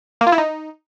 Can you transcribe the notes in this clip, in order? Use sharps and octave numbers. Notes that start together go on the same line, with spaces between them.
A#3
F4
E4
D#4